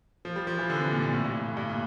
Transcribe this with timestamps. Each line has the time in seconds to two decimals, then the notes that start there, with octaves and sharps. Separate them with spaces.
0.25 F3
0.36 G3
0.47 F3
0.58 E3
0.70 D3
0.80 C3
0.91 A#2
1.02 A#2
1.13 A2
1.24 G2
1.57 G2
1.69 A#2